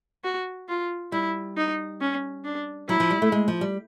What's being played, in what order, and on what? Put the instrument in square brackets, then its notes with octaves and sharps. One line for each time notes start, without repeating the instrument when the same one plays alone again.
[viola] F#4
F4
[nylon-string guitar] G3 [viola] E4
[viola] D#4
C#4
D4
[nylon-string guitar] F#3 [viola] E4
[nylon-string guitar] F3
G3
A3
G#3
F3
G3